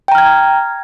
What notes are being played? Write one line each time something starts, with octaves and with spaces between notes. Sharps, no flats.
G5 A#5 F6 G#6